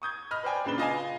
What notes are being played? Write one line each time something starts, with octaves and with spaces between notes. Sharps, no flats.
C#6 D#6 G6 G#6
D#5 B5 F6
B4 C5 D5 G5 G#5
A#2 C#3 D4 B4 E7 G7
F4 D#5 F5 G#5